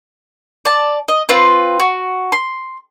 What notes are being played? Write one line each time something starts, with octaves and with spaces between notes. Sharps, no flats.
D5 A5
D#5
C4 F4 B4
F#4
C6